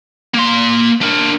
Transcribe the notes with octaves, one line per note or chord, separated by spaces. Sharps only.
A#3 C6
D4 A#4